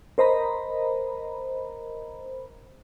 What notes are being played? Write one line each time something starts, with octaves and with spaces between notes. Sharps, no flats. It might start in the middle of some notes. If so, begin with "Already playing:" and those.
A#4 C5 D#5 A#5 B5